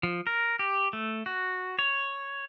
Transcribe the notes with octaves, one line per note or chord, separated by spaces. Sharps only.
F3
A#4
G4
A3
F#4
C#5